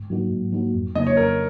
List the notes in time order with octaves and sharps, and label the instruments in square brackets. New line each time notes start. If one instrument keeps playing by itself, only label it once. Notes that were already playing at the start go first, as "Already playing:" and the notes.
Already playing: [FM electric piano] G#2
F#3 A#3 D#4 F#4
G#2
F#3 A#3 D#4 F#4
F2
[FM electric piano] C#3 F#3 A#3 D#4 [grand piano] D#5
[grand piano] C#5
[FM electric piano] F2 [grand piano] A#4